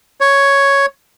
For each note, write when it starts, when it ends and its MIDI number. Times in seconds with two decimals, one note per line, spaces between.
0.21 0.86 73